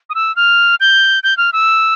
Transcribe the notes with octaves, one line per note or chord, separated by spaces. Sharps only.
D#6
E6
F6
G6
G6
F6
E6